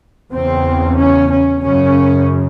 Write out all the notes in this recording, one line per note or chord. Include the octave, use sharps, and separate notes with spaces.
E2 C#3 C4
C#4
C#4
F#2 C#3 C#4